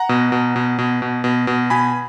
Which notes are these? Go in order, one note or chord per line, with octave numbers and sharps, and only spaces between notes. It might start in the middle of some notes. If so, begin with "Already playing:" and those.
Already playing: F#5 A#5
B2
B2
B2
B2
B2
B2
B2
B2 G#5 B5